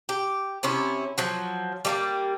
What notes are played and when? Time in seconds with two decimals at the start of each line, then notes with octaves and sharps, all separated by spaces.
0.09 G4
0.63 C3 C#4 E4
1.18 F3 F#3
1.85 G3 A3 A#3